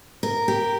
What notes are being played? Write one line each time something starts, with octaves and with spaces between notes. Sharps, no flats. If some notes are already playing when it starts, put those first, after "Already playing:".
A#4
G4